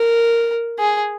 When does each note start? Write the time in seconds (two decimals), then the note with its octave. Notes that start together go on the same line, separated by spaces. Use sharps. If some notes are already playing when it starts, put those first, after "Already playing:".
Already playing: A#4
0.79 G#4